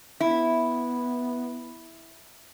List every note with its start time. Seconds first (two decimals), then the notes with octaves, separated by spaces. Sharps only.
0.20 B3 E4